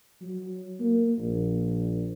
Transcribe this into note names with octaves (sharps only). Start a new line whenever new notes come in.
F#3
A#3
A#1